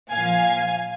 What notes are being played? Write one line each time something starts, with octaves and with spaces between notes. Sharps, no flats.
A#2 F3 F5 G#5